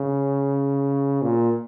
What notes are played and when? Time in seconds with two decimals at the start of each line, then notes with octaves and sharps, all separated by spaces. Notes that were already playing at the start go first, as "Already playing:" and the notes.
Already playing: C#3
1.22 A#2